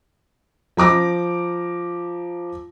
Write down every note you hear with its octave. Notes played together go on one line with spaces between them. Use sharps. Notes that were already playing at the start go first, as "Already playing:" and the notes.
F3 A#5 D6 A#6